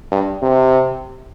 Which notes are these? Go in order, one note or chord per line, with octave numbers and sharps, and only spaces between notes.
G2
C3